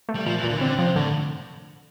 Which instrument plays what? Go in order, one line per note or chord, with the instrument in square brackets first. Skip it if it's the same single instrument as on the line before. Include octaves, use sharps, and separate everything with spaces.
[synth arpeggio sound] A3
[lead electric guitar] G3
[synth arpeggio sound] A#2 [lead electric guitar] F3
[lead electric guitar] E3
[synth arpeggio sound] A#2
[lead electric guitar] D3
E3
[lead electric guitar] D3 [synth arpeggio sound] C4
[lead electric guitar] C3 [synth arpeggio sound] F3
[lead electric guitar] A2 [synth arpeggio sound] D3